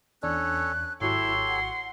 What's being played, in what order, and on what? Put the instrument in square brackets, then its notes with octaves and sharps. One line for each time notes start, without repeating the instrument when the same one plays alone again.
[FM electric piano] E2 D4 [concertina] C#4 A4 C#5 [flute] F#6
[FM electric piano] G#1 F#3 C#6 [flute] E4 [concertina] G4 A4 C#5 [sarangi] C6
[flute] F#5